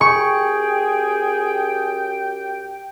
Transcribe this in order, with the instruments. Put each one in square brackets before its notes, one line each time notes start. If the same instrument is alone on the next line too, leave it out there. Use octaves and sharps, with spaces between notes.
[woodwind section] F#2 G4 G5 [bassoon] G#4 [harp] C#6